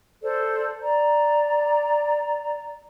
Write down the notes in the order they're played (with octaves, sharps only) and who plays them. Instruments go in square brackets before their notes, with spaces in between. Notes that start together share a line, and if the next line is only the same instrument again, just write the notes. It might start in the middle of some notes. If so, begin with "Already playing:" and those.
[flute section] A4 C5 D5
D5 A#5